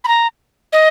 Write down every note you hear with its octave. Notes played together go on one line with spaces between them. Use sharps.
B5
A#5
D#5